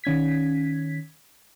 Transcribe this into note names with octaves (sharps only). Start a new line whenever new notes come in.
D#3 C#4 G#6 B6